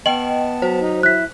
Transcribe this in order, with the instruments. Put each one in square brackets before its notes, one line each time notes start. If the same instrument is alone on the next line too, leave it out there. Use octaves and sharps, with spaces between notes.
[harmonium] B3 A5 [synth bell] D#5 G5 [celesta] F#7
[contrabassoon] F#3 [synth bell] C5
[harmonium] D#4
[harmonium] E4 [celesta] F#6 B6